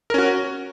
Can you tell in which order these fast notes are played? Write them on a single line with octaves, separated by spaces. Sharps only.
A#4 C#4 F#4